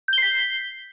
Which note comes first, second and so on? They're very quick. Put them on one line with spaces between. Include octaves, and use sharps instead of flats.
G6 G7 C7 B6